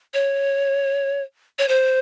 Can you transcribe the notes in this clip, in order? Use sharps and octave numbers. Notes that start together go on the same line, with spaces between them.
C#5
C#5
C5